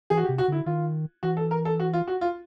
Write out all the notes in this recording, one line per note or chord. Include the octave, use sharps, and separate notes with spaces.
E3 G#4
F#4
G4
C3
F#4
D3 E4
D#3 F4
E3 F#4
A4
A#4
A4
F#4
F4
F#4
F4